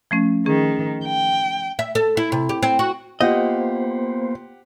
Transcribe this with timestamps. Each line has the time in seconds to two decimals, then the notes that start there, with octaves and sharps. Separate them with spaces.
0.11 F3 A3 C#4
0.46 D#3 C#4 G#4
1.05 G5
1.79 E5
1.95 A4
2.17 E4
2.32 C3
2.49 G4
2.63 C4
2.79 F#4
3.21 A#3 B3 F4 G4 C5 D#5 F#5